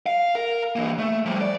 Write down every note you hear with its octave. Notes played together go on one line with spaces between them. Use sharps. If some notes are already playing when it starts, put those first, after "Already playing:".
F5
A#4
E3 A#3
A3
F3 G3
D5